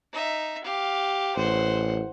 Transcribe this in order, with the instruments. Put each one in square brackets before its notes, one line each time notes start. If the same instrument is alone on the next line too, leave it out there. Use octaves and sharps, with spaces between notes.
[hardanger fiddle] D#4 E5
G4 F5
[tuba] A1 [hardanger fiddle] C5 F#5